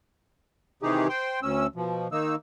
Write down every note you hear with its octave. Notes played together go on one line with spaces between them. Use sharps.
C3 D#3 E3 D#4 G4 G#4
C5 G5 C6
D2 C#4 E6
B2 F3
D#3 A#3 D#4 E6